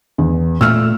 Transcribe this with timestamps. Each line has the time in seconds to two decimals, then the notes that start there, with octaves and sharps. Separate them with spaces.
0.18 E2
0.61 A#2 A3 E4 E6 F6